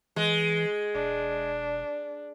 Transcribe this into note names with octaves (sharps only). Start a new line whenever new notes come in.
E3 G#3
E1 D4